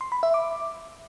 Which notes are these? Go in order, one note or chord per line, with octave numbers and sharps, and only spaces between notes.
C6
B5
E5
D6